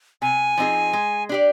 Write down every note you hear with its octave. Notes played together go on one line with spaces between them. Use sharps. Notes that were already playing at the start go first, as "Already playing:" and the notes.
C3 G#5
F3 C4 D#4 G#4
G#3
D4 G4 D5